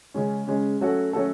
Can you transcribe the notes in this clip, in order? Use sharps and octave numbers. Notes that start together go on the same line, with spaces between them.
C#3 G#3 C#4
C#3 G#3 C#4
F#3 A3 C#4 F#4 A4
F#3 A3 C#4 F#4 A4